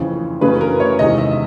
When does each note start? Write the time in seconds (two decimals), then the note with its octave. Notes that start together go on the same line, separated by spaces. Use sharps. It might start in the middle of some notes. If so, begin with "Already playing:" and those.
Already playing: F2 C#3 E3
0.41 F#2 C#3 E3 A3 C#4 B4
0.61 A#4
0.80 C#5
0.99 E2 C3 D#3 G#3 C#4 D#5
1.18 E5
1.31 E5